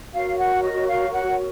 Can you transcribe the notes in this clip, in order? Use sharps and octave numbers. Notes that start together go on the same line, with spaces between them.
F#4 A#4 C#5 F5
F#5
D#5
F5
F#5